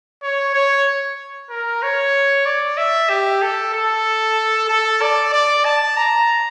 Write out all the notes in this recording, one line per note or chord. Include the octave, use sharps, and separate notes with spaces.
C#5
C#5
A#4
C#5
D5
E5
G4
A4
A4
A4
D5
D5
A5
A#5